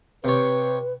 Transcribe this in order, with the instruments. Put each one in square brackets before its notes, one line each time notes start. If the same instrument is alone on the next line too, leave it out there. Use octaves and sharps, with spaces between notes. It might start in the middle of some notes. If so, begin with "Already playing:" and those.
[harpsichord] C3 C#5 [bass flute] B4